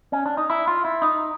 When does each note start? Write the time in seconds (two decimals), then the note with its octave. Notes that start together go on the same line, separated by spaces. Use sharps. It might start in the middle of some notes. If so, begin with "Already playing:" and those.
0.12 C#4
0.26 D4
0.37 D#4
0.50 E4
0.68 F4
0.85 E4
1.02 D#4